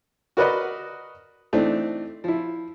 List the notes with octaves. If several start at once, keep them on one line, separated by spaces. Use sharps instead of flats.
F#4 A#4 B4 D5 D#5 F#5
E3 A3 C4 D4 D#4
F3 E4